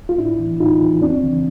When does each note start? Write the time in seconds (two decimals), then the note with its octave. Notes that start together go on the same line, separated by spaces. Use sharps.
0.09 F4
0.18 A2 D4 E4
0.40 E3
0.60 A2 D#4 F4
0.81 E3
1.02 F2 C4 D4
1.23 C#3 E3